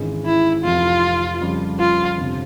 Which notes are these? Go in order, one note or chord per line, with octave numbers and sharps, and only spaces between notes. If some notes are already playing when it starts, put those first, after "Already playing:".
Already playing: G#1 G#2 E3 G#3 C#4
E4
F1 F2 E3 F4
F2 C#3 G3 C4
F4
G1 F2 C3